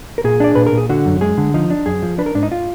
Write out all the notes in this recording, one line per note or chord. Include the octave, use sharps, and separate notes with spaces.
A#4
A#2 G#4
D4 D5
A#2 B4
A#4
A#2
G#4
D3 F#4
F#2
G#3 G#4
D3
F3 D#4
D4
F#2 G#4
F3
D4 B4
A#4
G#2 D4
D#4
F4